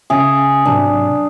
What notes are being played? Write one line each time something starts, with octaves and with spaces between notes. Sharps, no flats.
C#3 C#4 G#4 E5
G#2 C3 F#3 D4